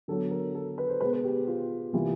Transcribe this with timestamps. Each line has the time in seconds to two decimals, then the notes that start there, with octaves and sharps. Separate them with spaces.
0.08 D3 F#3 B3 A4
0.31 A#4
0.55 A4
0.78 B4
0.89 C5
1.01 B2 G#3 B3 B4
1.13 B4
1.24 G4
1.47 F4
1.93 C3 E3 G3 A#3 F4